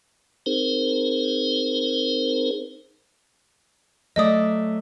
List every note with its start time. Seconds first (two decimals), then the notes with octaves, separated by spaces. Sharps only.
0.46 C4 D#4 G#4 A#4 C5
4.16 F#3 A3 D5 D#5 D#6